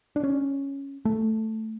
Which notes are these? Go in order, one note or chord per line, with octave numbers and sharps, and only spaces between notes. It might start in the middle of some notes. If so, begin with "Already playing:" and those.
D4
C#4
A3